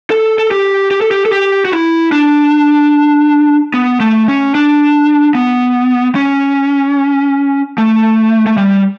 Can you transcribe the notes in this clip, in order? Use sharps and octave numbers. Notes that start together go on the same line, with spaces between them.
A4
A4
G4
G4
A4
G4
A4
G4
F#4
E4
D4
B3
A3
C#4
D4
B3
C#4
A3
A3
G3